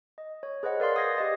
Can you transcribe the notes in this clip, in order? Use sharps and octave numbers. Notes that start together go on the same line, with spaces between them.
D#5
C#5
G#4 B4 C5 D#5 F#5
A#4 D5 F5 C6
F#5 D#6 G6 G#6 A#6 C7
G4 D#5 A6